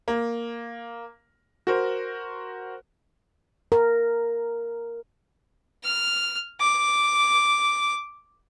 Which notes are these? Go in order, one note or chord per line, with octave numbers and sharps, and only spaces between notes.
A#3
F#4 A#4 C5
A#4
F6
D6